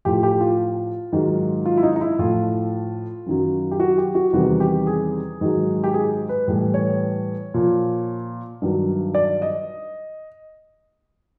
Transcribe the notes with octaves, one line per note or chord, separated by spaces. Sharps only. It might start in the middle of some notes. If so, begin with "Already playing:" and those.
A2 F3 G4
G4
F4
G#2 D#3 F#3
F4
E4
D#4
D#4
E4
A2 F3 F4
F#2 D#3 F#3
G4
F#4
G4
F#4
E2 C3 D#3 G3 F#4
G4
G#4
G#2 D#3 F#3
G4
G#4
B4
A2 E3 G3
C#5
A#2 F3
G2 D#3 F#3
D5
D#5